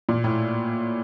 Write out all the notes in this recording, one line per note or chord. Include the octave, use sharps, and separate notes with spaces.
A#2
A2